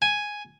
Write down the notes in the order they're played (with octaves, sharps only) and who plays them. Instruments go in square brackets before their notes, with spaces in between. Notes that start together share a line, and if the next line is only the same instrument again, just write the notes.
[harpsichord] G#5